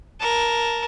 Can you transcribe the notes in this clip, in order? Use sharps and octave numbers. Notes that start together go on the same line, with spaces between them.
A#4 A5